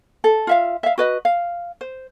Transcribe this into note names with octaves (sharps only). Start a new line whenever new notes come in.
A4
F4 E5 F5
E5 F5
F#4 B4 D#5
F5
C5